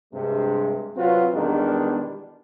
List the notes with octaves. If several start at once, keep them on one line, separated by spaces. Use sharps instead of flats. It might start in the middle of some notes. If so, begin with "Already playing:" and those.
G2 C3 G#3
C3 F#3 C4 F4 F#4 B4
E2 B2 D#3 G3 G#3 D4